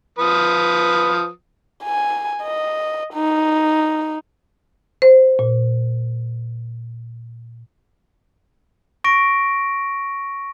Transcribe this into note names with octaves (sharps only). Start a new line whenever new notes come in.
F3 B4 D#6
G#5
D#5
D#4
C5
A#2
C#6 A#6 D7